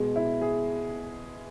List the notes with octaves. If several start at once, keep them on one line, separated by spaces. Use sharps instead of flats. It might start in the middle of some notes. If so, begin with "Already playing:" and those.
Already playing: B2 G#3
E4
G#4